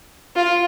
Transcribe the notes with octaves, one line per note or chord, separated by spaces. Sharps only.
F4